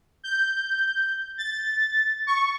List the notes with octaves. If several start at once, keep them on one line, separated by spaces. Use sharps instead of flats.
G6
A6
C#6